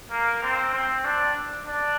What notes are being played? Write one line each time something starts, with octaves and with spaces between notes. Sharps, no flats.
A#3
C4
C4
D4
D4